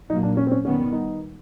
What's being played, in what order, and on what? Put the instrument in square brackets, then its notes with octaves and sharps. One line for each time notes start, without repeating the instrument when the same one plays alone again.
[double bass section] A#2 F#3 A#3 [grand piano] D#4
[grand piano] D4
C#4
C4
C#4
[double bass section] D#3 G3 B3 [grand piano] C#4
[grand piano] D#4